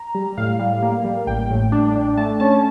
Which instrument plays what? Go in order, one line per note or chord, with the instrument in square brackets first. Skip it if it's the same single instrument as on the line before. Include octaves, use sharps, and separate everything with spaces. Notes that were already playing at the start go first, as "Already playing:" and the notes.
Already playing: [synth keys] A#5
G3
A2 F5
G3
A#3
G3
A1 G5
A2
D4
D4
A3 A5
C#4 A5